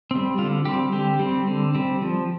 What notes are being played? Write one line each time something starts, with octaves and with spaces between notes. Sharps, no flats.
G3 C4
D3 F4
G3 C4 G4
D3 G4
G3 C4
D3
G3 C4
F3